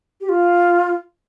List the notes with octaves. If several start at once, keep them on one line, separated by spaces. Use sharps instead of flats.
G4
F4